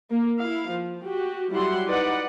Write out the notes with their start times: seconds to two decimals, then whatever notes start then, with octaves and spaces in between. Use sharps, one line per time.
0.11 A#3
0.40 E4 F5
0.70 F3
1.07 F#4 G4
1.53 F#3 G3 E4 G4 F#5 C6
1.88 D#4 B4 D5 F#5